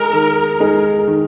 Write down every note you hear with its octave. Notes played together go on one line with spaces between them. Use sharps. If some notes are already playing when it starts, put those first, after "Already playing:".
Already playing: G#3 D#4 G#4 A#4
D#3
G#3 D#4 G#4
D#3